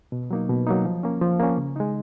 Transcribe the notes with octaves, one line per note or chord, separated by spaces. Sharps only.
B2
F#3 A#3 D#4
B2
F#3 A#3 D#4
F3
A#3 C#4
F3
A#3 C#4
C#3
G#3 D#4